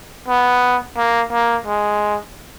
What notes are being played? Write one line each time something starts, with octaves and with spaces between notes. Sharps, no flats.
B3
A#3
A#3
G#3